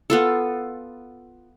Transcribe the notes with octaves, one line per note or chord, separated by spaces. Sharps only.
B3 F4 A4